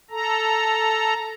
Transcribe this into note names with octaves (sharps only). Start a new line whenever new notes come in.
A4 A#5